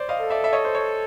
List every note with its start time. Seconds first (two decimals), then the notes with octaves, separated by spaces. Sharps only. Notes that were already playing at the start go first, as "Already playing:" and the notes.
Already playing: C5 D5
0.09 D#5 F5
0.21 A4
0.30 D5 E5
0.44 E5
0.53 C#5 D#5
0.65 C5
0.75 C#5